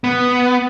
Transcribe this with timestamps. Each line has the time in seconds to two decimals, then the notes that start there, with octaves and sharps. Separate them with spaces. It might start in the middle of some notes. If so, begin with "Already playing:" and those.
0.04 B3